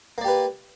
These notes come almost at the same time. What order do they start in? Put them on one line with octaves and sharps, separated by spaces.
A#3 D5 G4 B4